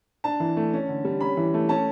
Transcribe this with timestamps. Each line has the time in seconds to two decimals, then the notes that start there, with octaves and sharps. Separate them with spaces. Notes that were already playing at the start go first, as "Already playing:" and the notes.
0.24 D4 A5
0.40 E3
0.57 A3
0.73 C#4
0.88 D3
1.05 G3
1.21 C#4 B5
1.37 E3
1.54 A3
1.69 C#4 A5